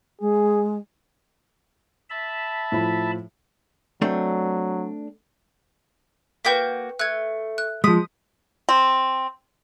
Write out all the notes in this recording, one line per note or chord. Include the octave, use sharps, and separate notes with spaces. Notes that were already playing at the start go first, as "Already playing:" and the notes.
G#3 G#4
E5 A5 B5
A2 F3 E4
F#3 A3 C4 D4
A#3 F#4 B4 G5 G6 B6
A3 F#6 G#6
F#6
F3 G#3 D#6 B6
C4